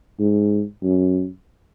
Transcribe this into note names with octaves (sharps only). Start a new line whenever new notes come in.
G#2
F#2